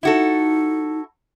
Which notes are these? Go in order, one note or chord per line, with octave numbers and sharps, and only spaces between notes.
D#4 E4 F#4 A4